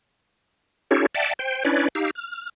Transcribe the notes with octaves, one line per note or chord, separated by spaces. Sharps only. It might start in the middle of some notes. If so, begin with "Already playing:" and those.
C#4 D#4 F4 G4 A4 C#5
D5 E5 F#5 G5 A5
C5 G5
C#4 D4 E4 B4 C#5 D5
D#4 G4 F5 E6
F6